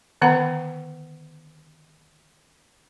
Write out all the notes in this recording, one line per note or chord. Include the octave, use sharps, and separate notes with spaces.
D3 D#3 B3 F#5 A#5